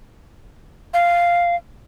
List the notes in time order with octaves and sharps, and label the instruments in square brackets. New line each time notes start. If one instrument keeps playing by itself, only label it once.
[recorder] F5